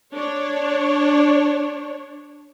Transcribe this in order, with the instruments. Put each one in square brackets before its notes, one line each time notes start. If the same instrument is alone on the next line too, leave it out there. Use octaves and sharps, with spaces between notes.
[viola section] D4 C#5